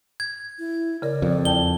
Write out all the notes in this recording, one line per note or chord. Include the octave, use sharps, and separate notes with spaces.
G#6
E4
C#3 A#4 D5
F2
E2 G5 A5 G7